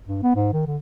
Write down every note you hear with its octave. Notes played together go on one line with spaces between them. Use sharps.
G2
B3
G#2
D#3
D3